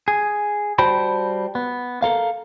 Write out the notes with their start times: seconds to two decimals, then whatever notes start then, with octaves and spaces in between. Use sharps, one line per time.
0.08 G#4
0.79 G3 F#4 C5 G5 A5 B5
1.55 B3
2.02 A4 A#4 F5